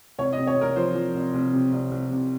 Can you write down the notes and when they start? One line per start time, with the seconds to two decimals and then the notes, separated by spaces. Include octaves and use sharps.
0.18 C2 C#5
0.33 D#5
0.38 C3
0.47 C#5
0.57 C2 A#4
0.76 F3 C5
0.95 F3
1.14 C2
1.34 C2
1.53 C3
1.72 C2
1.91 C2
2.11 C3